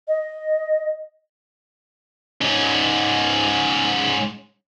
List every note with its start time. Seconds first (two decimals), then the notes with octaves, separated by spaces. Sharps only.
0.08 D#5
2.41 G#2 C#4